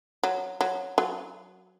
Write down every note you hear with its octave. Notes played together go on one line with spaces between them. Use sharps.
F#3
F#3
F#3